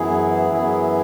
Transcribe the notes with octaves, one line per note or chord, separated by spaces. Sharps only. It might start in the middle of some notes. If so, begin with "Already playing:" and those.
Already playing: F#2 E3 B3 E4 G#4
F#2 E3 B3 E4 G#4